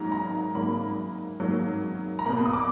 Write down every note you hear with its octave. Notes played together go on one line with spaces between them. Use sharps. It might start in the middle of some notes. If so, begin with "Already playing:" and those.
Already playing: G#2 F#3 A#3 A#5
A#5
G#2 F#3 A#3 B5
G#2 F#3 A#3
A#5
B2 A#3 B5
D#6
D6